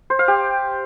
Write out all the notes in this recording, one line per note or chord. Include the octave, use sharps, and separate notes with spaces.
C5
F5
G4